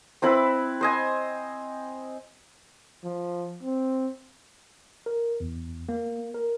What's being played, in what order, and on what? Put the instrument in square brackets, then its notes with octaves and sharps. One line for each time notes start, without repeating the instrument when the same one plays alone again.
[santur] C4 E4 B4 B5
C5 D#5 G#5
[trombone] F3
C4
[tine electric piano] A#4
E2
A#3
A#4